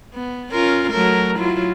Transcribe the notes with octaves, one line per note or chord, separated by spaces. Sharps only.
B3
C#4 F4 A#4
F#3 A3 A#4
F#3 E4 F4